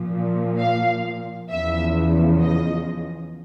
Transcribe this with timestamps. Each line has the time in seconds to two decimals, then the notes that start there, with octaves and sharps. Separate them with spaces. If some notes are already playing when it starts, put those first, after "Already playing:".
Already playing: A#2 F3
0.58 F5
1.50 E2 C#3 F3 E5
2.42 D#5